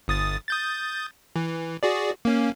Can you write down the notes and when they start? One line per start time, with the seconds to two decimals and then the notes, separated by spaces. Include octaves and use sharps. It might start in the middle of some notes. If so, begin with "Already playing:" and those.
0.08 G1 D#6 A6
0.48 D#6 G6 A6
1.36 E3
1.83 F#4 G#4 D5
2.25 A#3 C#4